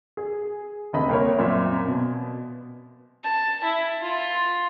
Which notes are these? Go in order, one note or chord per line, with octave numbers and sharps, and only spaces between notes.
G#4
D#1 D2 C3 D#5 B5
C2 A#3 A#4 C#5
F#2 A#2 C4 E5
B2
A5
E4
F4